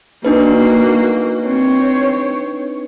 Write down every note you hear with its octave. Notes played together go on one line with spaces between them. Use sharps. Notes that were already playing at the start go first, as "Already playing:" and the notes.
A#3 D4 D#4 F#4 B4
C4 C#5